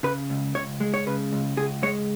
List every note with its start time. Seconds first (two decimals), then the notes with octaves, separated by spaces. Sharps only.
0.03 C#3 B4
0.30 C#2
0.55 C#2 C#5
0.80 G#3
0.94 C#5
1.07 C#3 B4
1.33 C#2
1.57 C#2 G#4
1.83 G#3 C#5